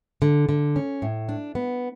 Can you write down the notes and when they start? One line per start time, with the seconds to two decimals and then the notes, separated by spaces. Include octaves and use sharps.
0.22 D3
0.49 D3
0.76 C#4
1.02 A2
1.29 D4
1.55 B3